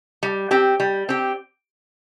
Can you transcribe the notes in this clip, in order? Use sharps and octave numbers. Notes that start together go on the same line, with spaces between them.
G3
C4 G4
G3
C4 G4